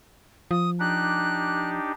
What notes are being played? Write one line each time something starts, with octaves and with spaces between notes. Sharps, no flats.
F3 D#6
D4 D#4 G4 F#6